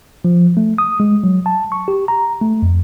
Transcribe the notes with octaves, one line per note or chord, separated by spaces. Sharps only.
F3
A3
D#6
G#3
F#3
A5
C#6
G4
A#5
A3
F2